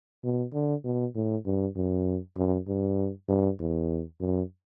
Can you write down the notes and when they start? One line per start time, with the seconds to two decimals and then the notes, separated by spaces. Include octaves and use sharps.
0.24 B2
0.54 D3
0.84 B2
1.15 A2
1.46 G2
1.76 F#2
2.37 F#2
2.68 G2
3.29 G2
3.60 E2
4.20 F#2